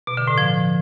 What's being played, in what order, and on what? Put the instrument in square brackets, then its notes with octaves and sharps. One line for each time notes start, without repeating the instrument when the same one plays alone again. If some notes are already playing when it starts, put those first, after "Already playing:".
[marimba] B2
D3
A2
F3